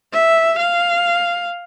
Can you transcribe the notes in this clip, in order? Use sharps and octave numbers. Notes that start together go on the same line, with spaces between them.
E5
F5